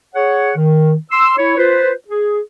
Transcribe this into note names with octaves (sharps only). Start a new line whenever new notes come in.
G#4 C#5 F#5
D#3
C6 E6
E4 C#5
F4 B4 C5
G#4